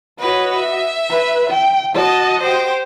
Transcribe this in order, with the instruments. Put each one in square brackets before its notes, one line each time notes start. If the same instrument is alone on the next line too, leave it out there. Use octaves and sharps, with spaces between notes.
[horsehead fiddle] F#4 D#5 [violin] B4 C#5
[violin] E5
[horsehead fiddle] B4
G5
[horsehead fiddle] F#4 D#5 [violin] A5
[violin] G4 C5